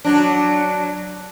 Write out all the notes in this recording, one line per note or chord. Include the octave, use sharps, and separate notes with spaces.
F#3 D4